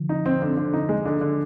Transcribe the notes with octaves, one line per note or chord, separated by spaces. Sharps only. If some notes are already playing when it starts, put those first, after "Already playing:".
Already playing: D3 F3
D#4
C4
D3
D3
D#4
G#3
D3
D3